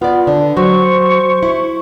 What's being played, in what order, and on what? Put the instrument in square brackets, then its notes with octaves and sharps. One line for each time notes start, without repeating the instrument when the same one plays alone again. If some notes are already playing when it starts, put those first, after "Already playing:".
[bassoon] B3 [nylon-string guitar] F4 D5
[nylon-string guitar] D3 [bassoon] D4
[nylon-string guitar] F#3 F#4 [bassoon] C5 [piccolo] C#6
[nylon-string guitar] E4